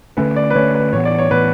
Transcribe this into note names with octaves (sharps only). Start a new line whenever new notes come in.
D3 A3 C#4 B4
D5
B4
D3 A3 C#4 C#5
B4
A2 E3 B3 C#5
D5
C#5
A2 E3 B3 B4